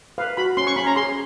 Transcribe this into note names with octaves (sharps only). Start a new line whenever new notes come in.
B4 F5
F#4 B5
C#4 C6
C#6
C#4 B5
A#5
G#4 C6